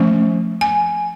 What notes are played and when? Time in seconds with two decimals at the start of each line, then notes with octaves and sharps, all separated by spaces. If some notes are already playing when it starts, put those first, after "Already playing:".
Already playing: F3 A3 C#4
0.61 G#5